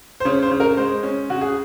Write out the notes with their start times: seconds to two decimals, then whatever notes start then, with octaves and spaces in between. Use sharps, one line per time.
0.20 C5
0.25 C#3 C#5
0.43 C5
0.51 C#3
0.60 A#4
0.77 G#3 C5
1.03 C#4
1.30 C#3 F#4
1.41 G#4